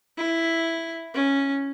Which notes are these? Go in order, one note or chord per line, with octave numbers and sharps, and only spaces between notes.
E4
C#4